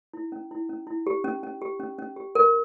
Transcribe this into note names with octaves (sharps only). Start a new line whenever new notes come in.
E4
C#4
E4
C#4
E4
G4
C#4
C#4
G4
C#4
C#4
G4
A#4